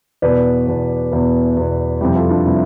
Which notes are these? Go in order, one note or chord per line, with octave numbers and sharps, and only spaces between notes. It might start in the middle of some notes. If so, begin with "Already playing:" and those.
E2 B2 B3 B4 D5
E2 B2 B3
E2 B2 B3 E4
E2 B2 B3
F2 C3 G3 E4 G4
F4 A4
D4 F4
C3 G3 E4